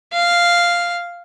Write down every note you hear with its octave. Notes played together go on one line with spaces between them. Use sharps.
F5